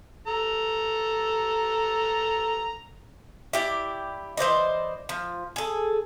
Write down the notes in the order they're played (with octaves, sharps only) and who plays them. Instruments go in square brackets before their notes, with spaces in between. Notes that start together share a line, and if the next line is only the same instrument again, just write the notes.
[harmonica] A4 A#5
[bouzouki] E4 G4 D5
E3 C5 D5 D#5
F3
G#4 A4